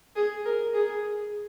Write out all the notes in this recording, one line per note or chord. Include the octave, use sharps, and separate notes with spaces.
G#4
A#4
G#4